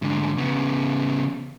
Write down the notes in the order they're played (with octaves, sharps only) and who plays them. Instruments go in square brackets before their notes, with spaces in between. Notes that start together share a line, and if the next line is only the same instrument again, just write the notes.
[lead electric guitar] G#2 D3
C#3 B3